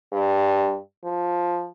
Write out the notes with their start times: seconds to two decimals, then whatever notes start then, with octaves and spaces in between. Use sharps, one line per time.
0.13 G2
1.04 F3